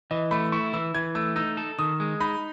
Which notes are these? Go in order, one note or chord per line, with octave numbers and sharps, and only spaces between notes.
E3 D#5
A3 B5
E4 C#6
E3 E6
E3 G#6
A3 E6
D#4 E6
A4
D#3 D#6
G#3
D#4 B5